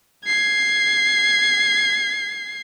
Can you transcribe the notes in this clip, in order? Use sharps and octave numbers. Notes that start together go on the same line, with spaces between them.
G#6 C7